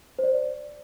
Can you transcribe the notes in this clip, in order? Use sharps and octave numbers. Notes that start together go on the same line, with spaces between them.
C5
D5